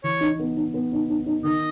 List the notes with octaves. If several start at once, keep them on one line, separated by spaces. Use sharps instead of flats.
E3 C#5
D#4
B3
D#4
B3
D#4
D#4
D#4
D#3 D#5